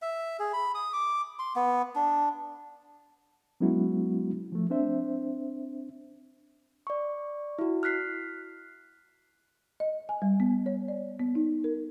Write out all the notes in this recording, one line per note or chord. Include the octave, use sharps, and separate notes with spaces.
E5
G#4
B5
D#6
D6
C6
B3
D4
F#3 G#3 B3 C#4 E4 F#4
F3 A3
C4 D4 C5 E5
D5 C#6
E4 F#4
F6 F#6 B6 C7
D#5
G#5
G3
B3
C#5
D5
B3
D#4
A#4